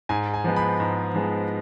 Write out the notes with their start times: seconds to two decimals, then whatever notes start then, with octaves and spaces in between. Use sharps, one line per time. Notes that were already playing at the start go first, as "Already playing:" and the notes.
0.09 G#2 G#5
0.34 G#5
0.44 F3 G#3 B3
0.56 B5
0.80 G#2
1.14 F3 G#3 B3